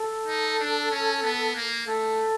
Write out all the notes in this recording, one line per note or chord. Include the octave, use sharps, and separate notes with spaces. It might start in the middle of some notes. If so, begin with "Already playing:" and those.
Already playing: A4
D#4
D4
C#4
B3
A#3
A3 A4